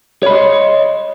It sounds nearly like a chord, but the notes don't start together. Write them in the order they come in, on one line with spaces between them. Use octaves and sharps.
C#5 B5 D#5 C6